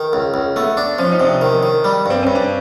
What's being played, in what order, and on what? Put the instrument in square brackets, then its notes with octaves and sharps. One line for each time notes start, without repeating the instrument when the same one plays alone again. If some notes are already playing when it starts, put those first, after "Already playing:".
Already playing: [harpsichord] D#3
C#2
C#2
[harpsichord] A3 [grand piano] B3
[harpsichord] D4
[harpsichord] F3 [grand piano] C#4
[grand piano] D#4
[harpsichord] C3 [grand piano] D4
[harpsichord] D#3
D#3
G3
[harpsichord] G2 [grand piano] C4
[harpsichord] G2 [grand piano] C#4
[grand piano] D4